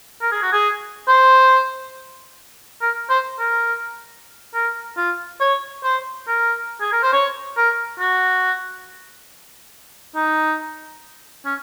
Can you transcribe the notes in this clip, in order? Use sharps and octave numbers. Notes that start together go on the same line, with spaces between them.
A#4
G#4
F#4
G#4
C5
A#4
C5
A#4
A#4
F4
C#5
C5
A#4
G#4
A#4
C5
C#5
A#4
F#4
D#4
C#4